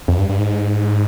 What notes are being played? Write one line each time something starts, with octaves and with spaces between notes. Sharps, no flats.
F2
G2
G2
G#2